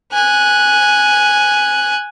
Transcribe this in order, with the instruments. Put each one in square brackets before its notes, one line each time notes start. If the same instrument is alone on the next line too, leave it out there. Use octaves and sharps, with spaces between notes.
[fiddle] G#5 F#6